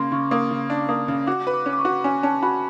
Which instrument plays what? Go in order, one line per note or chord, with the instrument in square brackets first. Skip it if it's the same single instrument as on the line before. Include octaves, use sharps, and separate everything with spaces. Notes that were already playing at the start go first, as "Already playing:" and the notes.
Already playing: [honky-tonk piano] C#3 A#3 [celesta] C6
[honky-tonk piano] C#3 [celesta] C#6
[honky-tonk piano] A#3 [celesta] D#6
[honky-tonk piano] C#3
D4
[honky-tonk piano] A#3 [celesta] D#6
[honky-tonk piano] C#3
[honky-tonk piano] F#4 [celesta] D6
[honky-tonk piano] B4
[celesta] D6
[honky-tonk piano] C#4
[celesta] D6
C#6
[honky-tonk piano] F#4
[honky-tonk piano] C#4 [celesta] G#5
[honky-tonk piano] C#4 [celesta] A5
[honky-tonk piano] F#4 [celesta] B5